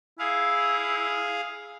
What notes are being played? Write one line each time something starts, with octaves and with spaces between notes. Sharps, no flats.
E4 G#4 F5